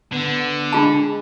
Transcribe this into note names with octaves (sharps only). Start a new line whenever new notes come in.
D3 B3
G#3 D4 F4 A5